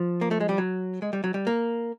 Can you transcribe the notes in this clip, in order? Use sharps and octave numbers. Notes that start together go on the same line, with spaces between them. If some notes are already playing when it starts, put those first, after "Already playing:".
Already playing: F3
A#3
A3
G#3
G3
F#3
G#3
G3
F#3
G3
A#3